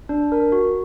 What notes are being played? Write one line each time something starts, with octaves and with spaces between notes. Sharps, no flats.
D4
A#4
F#4